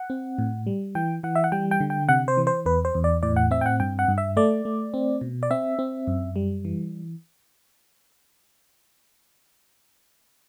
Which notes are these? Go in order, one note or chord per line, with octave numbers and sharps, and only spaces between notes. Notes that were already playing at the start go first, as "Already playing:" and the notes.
Already playing: F#5
C4
A2
G3
E3 G5
E3 F#5
E5
F#5
G3 G5
G5
D3
G5
C3 F#5
C5
E3
C5
E2 B4
C5
E2
D5
A2 D5
F#5
C4 E5
G5
F#5
G2 G5
F#5
G2
E5
A3 D5
A3
C4
B2
D5
C4 E5
C4
F#2
G3
E3